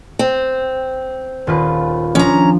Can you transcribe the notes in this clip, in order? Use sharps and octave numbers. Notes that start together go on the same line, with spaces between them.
C4
D#1 F4 B4
F3 C#4 D4 A#5